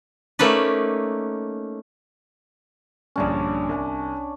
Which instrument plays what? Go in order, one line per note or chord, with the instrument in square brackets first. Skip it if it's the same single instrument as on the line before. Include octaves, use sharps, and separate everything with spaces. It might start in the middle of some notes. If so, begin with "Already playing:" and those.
[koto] A3 A#3 C#4 D#4 B4 D5
[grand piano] A#1 G2 D3 [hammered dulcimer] C#4 D4 D5
[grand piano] C2